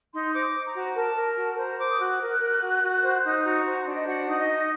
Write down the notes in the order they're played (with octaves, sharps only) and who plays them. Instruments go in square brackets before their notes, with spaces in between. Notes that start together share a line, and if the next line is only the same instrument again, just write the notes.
[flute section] D#4 C6
C5 D6
C5
A#5
F#4
A#4 A5
A#4
F#4 A5
C5 A#5
C5 D6
D#6
F#4 F#6
A#4
A#4
F#4
F#4
C5
D#4
F#4 A#5
C5
D4
D#5
F#4 F#5
D#4
D#5
D#4